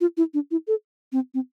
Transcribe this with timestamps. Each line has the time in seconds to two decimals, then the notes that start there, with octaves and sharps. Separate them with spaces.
0.01 F4
0.17 E4
0.34 D4
0.51 E4
0.68 A4
1.12 C4
1.34 C4